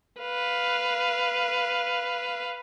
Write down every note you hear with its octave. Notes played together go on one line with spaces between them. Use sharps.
B4 F5